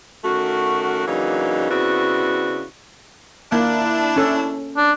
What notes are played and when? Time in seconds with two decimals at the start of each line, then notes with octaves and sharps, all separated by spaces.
0.24 D#3 A3 C#4 F#4
1.07 C#3 E3 F#3 A#3 D4 D#4
1.70 C#3 B3 C4 D4 E4 F#4
3.52 A#3 D4 E4
4.16 C#4 A4
4.77 D4